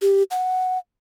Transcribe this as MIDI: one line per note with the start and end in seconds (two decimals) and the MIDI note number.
0.02 0.23 67
0.31 0.78 78